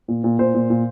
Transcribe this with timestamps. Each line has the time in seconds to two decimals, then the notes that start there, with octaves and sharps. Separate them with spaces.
0.08 A#2
0.24 A#2
0.39 A#2 C5
0.54 A#2
0.70 A#2